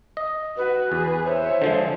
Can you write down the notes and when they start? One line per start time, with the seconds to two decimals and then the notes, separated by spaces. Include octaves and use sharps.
0.17 D#5
0.57 F#4 B4
0.92 E2 G#4
1.25 C5 C#5 E5
1.62 D3 F3 G#3